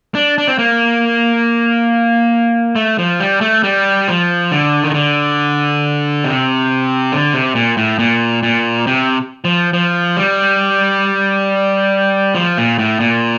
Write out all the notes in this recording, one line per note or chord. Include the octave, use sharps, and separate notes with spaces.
D4
D4
C4
A#3
A3
F3
G3
A3
G3
F3
D3
D#3
D3
C3
D3
C3
A#2
A2
A#2
A#2
C3
F3
F3
G3
F3
A#2
A2
A#2